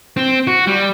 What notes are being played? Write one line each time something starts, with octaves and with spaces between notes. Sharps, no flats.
C4
F#4
G3